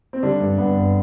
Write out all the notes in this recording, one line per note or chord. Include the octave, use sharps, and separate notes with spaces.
C4
D3 G3 D4
G2
G2 B3
G1